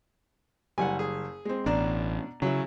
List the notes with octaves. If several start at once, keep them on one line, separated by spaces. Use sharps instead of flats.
F#1 G3 F#5 G#5
G#4
G#3 C4
A1 B2 D4 D5 A#5
C#3 F#3 E4